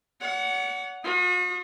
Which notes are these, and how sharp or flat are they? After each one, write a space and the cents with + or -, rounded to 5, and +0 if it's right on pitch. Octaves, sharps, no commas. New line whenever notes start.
C#5 +45 F#5 +0
F#4 -45 D#6 -10